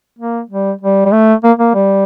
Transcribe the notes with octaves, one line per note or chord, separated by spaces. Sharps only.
A#3
G3
G3
G3
A3
A#3
A#3
G3